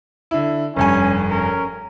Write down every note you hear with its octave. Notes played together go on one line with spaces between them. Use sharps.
D3 E4
F1 G2 C#4 G#5
C#4 A#4